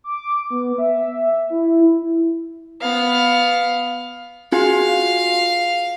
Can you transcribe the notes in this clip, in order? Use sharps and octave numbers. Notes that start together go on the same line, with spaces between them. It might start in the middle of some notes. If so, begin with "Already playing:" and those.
D6
B3
E5
E4
B3 F5
F4 F#4 G#4 F5